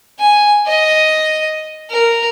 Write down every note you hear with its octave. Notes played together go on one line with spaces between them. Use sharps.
G#5
D#5
A#4